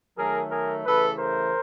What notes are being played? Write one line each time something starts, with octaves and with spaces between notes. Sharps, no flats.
D#3 F#3 A3 G#4 A#4
G#4 A#4
C#3 E3 A3 A4 B4
A#4 C5